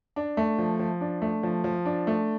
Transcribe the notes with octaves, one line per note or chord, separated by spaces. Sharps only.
D4
A3
F3
F3
D4
A3
F3
F3
D4
A3